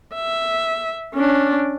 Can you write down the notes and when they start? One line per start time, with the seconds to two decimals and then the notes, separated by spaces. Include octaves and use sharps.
0.15 E5
1.15 C#4 D4